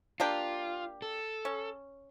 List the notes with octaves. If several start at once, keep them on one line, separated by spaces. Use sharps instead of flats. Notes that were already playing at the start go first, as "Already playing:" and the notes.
A#3 D4 F4 G4
A4
C#4